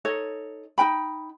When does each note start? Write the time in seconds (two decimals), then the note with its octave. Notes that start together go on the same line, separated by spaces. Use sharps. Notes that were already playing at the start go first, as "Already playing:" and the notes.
0.05 D#4 A4 C#5 D#5
0.78 D#4 A#4 G5 B5